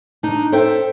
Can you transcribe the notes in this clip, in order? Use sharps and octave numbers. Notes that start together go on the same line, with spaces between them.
D4 D#4
A4 C5 E5 G5